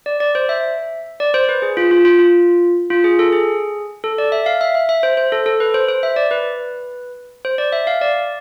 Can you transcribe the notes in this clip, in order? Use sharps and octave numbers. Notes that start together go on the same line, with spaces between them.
D5
D5
C5
E5
D5
C5
B4
G#4
F4
F4
F4
F4
F4
G#4
A4
G#4
A4
D5
E5
F5
E5
E5
E5
C5
C5
A4
A4
B4
C5
C5
E5
D5
B4
C5
D5
E5
F5
D5